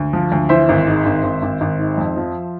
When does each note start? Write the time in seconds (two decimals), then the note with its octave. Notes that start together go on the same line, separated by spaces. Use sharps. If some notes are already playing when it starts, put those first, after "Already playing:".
Already playing: D2
0.13 F3
0.32 D2
0.49 E3 C5 E5
0.69 G#1
0.87 G#2
1.06 G#1
1.23 G#1
1.42 G#1
1.61 G#1
1.79 G#2
1.97 F2
2.16 F3